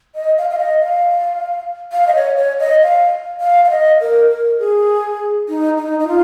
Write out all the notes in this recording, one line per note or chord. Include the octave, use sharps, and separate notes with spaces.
D#5
F5
F5
D#5
F5
F5
D#5
C#5
C#5
D#5
F5
F5
F5
D#5
A#4
A#4
G#4
D#4
D#4
D#4
F4